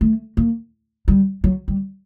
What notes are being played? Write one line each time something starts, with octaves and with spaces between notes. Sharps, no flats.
A3
A#3
G3
F#3
G3